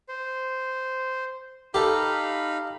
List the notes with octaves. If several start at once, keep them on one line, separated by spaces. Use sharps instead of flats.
C5
D#4 G4 A4 F5 B5